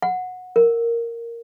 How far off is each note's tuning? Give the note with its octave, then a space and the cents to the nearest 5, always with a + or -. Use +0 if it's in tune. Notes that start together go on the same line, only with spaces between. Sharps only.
F#5 -15
A#4 -5